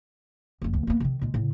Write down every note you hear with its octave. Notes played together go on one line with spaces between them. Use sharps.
F#1 F#2
D2
A#3 B3
C3 D#3
A#2 G#3
A2 C#3